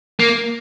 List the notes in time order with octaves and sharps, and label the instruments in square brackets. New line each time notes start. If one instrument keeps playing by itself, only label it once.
[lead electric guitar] A#3